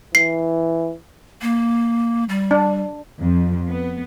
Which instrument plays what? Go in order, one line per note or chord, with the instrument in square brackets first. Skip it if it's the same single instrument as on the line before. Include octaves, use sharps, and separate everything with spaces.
[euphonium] E3 [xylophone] C7
[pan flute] A#3
G3
[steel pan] D4
[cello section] F2
B3